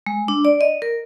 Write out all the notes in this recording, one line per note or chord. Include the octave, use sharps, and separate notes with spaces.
G#3
D4
D5
D#5
A#4